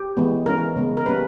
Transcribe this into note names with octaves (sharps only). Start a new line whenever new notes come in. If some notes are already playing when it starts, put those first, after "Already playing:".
Already playing: G4
E3 G#3 B3
E3 G#3 C#4 A#4
C#3 G#3 B3
A#4
G3 A#3 C#4 B4